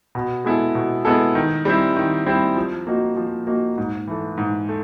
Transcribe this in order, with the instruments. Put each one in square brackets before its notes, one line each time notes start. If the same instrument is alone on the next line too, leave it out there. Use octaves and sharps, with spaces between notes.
[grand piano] B2
G#3 B3 E4 A4
B2
G#3 B3 E4 A4
D#3
G3 C4 E4
D#3
G3 C4 E4
F3
A#3 D#4 F#4
F3
A#3 D#4 F#4
G#2
E3 A3
G#2
A3